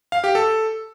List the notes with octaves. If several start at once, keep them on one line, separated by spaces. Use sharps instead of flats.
F5
G4
A4